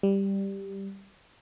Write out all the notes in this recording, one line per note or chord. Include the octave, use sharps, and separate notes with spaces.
G3